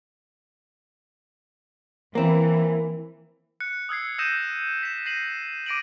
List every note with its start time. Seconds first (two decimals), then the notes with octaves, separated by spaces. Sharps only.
2.15 E3 A#3 C4
3.60 F#6 C#7
3.89 D#6 E6 G#6 C7
4.18 D#6 E6 G6 A#6 D#7 E7
4.83 B6 E7
5.06 A#6 C7 D#7 F#7
5.66 D6 A#6 D7 D#7 F#7